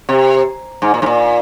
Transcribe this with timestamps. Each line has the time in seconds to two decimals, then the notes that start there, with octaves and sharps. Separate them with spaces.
0.09 C3
0.82 G#2
0.94 A#2
1.02 G#2
1.06 A#2